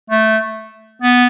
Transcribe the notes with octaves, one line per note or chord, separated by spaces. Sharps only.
A3
B3